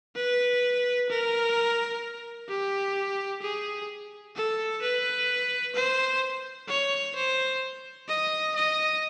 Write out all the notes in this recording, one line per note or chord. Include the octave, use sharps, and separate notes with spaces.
B4
A#4
G4
G#4
A4
B4
C5
C#5
C5
D#5
D#5